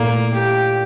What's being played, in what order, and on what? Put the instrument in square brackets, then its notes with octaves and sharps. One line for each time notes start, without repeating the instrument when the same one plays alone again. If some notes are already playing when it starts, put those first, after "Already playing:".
Already playing: [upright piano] A#2 A3 E4 A4 [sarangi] A#3
[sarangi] G4